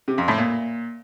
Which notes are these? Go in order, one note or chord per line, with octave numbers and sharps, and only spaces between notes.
C3
F2
A2
A#2